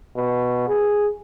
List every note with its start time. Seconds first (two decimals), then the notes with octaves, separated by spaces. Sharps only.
0.17 B2
0.68 G#4